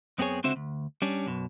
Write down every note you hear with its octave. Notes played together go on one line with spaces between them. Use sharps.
F#2 B3 C4 F#4 G#4 C#5
C#2 D3 C4 F#4 C5 E5
D2
G3 C#4 D4
B1 F#2 B2